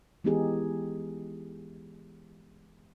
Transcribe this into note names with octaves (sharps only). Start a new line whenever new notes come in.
E3 G#3 B3 D#4 G4 G#4